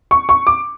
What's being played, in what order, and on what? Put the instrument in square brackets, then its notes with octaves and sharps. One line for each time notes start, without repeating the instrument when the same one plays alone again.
[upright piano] C#6
C#6
D6